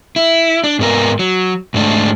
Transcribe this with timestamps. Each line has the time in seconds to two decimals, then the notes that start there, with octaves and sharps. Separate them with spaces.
0.16 E4
0.64 D4
0.79 G#2 B3 A#4
1.19 F#3
1.74 G#2 A3 D4